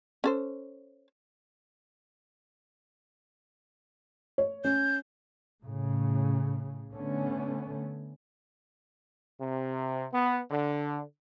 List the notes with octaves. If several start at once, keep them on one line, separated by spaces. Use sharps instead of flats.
C#4 A4 C5
C#5
C#4 G6
A2 C#3
D3 A3 B3 C#4
C3
B3
D3